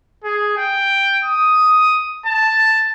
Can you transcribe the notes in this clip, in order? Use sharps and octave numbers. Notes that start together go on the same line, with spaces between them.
G#4
G5
D#6
A5